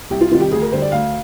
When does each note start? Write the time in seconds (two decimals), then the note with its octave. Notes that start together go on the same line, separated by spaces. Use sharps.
0.10 C2 G4
0.21 F4
0.32 C3 D#3 G3 F4
0.41 G4
0.51 D2 G#4
0.62 A#4
0.72 D3 G3 C5
0.82 D5
0.92 D2 F5